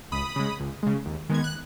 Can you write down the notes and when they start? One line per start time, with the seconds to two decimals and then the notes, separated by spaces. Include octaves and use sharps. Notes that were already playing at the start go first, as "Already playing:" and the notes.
0.12 C#2 B5 D#6
0.36 C#3 G#3
0.60 C#2
0.83 C#3 G#3
1.06 D#2
1.29 D#3 G#3 B3 G#6
1.44 F#6